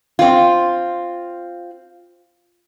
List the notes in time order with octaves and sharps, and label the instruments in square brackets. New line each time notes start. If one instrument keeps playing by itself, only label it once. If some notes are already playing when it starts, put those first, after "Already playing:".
[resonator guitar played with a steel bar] C4 F4